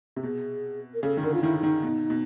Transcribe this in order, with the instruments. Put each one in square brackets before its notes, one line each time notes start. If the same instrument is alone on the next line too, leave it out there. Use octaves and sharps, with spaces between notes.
[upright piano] C3
[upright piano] B2 [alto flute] G#4
[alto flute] A#4
[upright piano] C#3 [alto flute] A4
[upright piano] D#3
[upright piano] D3 [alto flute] A#4
[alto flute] F4
[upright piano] D#3 [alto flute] E4
[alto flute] E4
[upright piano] D#3 [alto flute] D#4
[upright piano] B2
B2